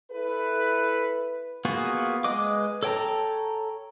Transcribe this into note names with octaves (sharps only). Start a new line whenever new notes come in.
E4 A4 B4
A#3 B3 F4 F#4 G#4
G#3 B4 D#5 D6
A4 C#5 G5 A5 A#5